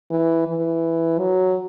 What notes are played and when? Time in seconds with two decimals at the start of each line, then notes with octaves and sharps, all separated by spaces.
0.11 E3
0.47 E3
1.19 F#3